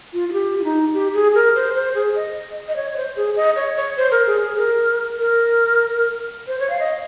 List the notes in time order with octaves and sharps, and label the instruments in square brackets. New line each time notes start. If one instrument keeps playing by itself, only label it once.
[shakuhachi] F4
F4
G4
F4
D#4
G4
G#4
A#4
C5
C5
G#4
D#5
D#5
C#5
C#5
C5
G#4
D#5
C#5
C#5
C5
A#4
G#4
G#4
A#4
A#4
C5
C#5
F5
D#5